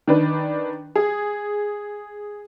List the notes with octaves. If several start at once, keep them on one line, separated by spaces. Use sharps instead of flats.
D#3 D4 B4
G#4